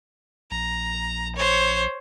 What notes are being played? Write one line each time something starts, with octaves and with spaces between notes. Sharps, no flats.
A#1 A#5
C5 C#5